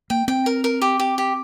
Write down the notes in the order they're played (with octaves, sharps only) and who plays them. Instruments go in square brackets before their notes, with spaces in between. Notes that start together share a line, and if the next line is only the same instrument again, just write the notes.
[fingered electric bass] A#3 [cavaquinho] G5
[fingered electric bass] C4 [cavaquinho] G5
[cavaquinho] A#4
A#4
G4
G4
G4